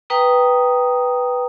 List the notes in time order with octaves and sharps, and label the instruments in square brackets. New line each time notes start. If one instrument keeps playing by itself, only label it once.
[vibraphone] B4 G5 A#5 D#6